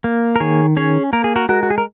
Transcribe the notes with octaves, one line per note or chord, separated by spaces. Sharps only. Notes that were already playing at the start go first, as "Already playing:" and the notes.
A#3
A#4
D#3 G#4 C#5
C#4 G#4 C#5
A#3 A#4
G#4
F#4 A#4
G#3 F#4 A#4
F#4
G#4
A#4